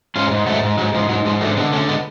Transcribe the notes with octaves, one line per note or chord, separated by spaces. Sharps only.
G#2 C#4 F4
G#2
G#2 F#3 A3
G#2
G#2 F#3
G#2 F3
G#2 F#3
G#2 F3 G#3
D3 F#3 A3
D3 G#3 B3
D3 A3 C#4
G#3 B3